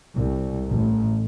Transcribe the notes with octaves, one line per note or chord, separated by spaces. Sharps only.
C2
A1